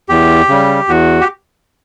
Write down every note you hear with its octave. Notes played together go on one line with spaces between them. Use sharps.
E2 G4
C#3 G3
E2 F#4
G4